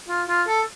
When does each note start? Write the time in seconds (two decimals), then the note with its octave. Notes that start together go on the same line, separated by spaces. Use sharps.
0.08 F4
0.29 F4
0.48 A4